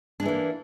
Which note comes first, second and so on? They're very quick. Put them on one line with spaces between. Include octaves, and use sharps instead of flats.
D4 G#3 E3 A#3